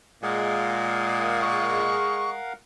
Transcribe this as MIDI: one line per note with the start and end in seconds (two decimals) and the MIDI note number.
0.23 1.96 46
0.23 2.36 56
0.23 2.53 70
0.23 2.53 77
0.23 2.53 78
1.41 2.30 85